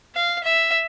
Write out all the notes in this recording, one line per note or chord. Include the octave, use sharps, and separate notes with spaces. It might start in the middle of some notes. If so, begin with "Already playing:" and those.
F5
E5